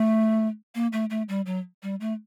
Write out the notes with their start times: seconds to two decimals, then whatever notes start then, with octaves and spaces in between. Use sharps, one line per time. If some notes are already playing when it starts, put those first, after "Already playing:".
Already playing: A3
0.75 A#3
0.93 A3
1.10 A3
1.29 G3
1.46 F#3
1.83 G3
2.00 A3